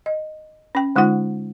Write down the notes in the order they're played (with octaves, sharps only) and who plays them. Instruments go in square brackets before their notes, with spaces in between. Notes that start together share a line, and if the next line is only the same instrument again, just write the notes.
[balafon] D#5
C#4 G5
D3 G#3 D#4 F4 F#5